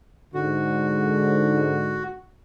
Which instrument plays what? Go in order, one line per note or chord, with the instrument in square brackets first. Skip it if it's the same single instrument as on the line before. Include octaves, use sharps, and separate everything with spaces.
[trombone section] G#2 D3 [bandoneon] F#4